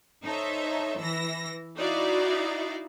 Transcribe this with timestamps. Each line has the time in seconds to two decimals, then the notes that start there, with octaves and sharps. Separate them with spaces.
0.24 D#4 A4 C5 C#5 E5
0.99 E3 E6 A#6
1.77 D#4 E4 F#4 D5 E5 F5